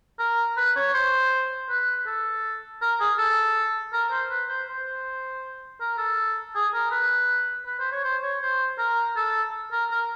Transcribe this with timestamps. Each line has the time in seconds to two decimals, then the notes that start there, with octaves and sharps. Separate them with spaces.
0.19 A#4
0.57 B4
0.76 C#5
0.94 C5
1.69 B4
2.06 A4
2.82 A#4
3.00 G#4
3.18 A4
3.93 A#4
4.11 C5
4.30 B4
4.49 C5
4.68 C5
5.80 A#4
5.98 A4
6.55 G#4
6.74 A#4
6.91 B4
7.66 B4
7.79 C5
7.92 C#5
8.04 C5
8.22 C#5
8.42 C5
8.78 A#4
9.16 A4
9.72 A#4
9.91 A#4